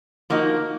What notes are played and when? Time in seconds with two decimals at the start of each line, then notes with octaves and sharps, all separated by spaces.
0.30 F3 A#3 D#4 F#4